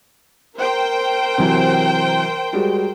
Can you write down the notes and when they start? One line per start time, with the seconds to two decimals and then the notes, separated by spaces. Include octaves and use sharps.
0.56 A#4 C5 G5
1.38 C3 E3 F#3
2.53 G3 G#3 F#4